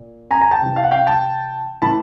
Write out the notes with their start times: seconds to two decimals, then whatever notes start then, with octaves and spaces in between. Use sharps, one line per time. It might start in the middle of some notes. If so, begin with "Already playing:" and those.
Already playing: A#2
0.31 G#5 A#5
0.41 G#5 A#5
0.51 G5 A5
0.61 C3 E3
0.76 F5
0.84 F#5
0.91 F5 G5
1.06 G5 A5
1.82 A2 E3 A5 B5